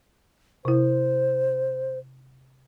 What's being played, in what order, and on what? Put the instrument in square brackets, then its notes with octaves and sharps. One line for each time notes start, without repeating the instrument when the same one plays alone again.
[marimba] C3 E4 [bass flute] C5